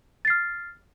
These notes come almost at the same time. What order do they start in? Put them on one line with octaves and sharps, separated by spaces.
A6 C7 F6